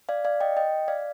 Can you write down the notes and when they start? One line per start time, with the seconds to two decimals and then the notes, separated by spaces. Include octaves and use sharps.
0.09 D5 F5
0.25 D5 F5
0.41 D#5 G5
0.57 D#5 G5
0.88 D5 F5